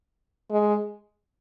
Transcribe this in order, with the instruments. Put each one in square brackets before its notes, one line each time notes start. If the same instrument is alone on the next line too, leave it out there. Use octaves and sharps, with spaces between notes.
[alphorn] G#3